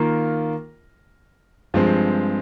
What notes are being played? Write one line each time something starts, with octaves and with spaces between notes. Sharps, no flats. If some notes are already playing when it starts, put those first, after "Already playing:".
Already playing: D#3 A#3 F4 A#4
G2 F3 G#3 C4